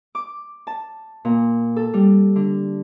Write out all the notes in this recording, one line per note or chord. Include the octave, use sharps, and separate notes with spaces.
D6
A5
A#2
A4
G3
D3